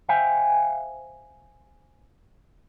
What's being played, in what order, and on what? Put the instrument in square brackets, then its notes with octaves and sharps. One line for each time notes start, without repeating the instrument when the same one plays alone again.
[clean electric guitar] C5 E5 F5 G5 G#5